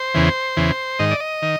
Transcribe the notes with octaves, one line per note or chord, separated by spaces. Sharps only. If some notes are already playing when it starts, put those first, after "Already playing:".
Already playing: C5
E2 C#3 E3
E2 C#3 E3
G#2 D#3 D#5
D5
D#5
D#3